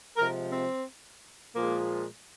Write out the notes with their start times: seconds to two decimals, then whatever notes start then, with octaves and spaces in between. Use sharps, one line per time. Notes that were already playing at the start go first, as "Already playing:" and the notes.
0.17 C3 F3 G#3 A#4
0.52 C4
1.56 A#2 F3 G#3 A#3